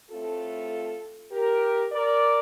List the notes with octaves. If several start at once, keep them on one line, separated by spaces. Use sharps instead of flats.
A2 A3 C4 F4 A4
G4 A#4
A#4 D5